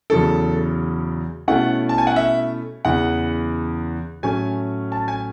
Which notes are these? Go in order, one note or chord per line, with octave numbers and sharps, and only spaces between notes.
E2 C#3 F#3 C#4 E4 A4
B2 A3 C#4 E4 F#5
A5
G#5
F#5
E5
E2 C#3 E3 F#5
A2 F#3 A3 C#4 G#5
A5
G#5